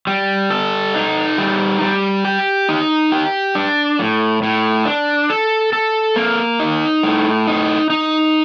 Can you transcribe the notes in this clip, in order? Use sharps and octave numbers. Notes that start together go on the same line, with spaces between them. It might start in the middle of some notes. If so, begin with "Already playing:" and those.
G3
A4
D#4
G3
G3
G4
D#4
G4
D4
A2
A2
D4
A4
A4
A#3
D#4
A2
D#4
D#4